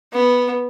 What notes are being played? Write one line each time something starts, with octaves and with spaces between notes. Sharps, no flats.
B3